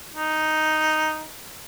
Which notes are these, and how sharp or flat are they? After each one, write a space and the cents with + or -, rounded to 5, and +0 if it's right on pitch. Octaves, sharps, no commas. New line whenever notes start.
D#4 +0